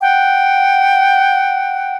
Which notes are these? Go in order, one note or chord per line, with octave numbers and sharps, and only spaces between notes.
F#5 G5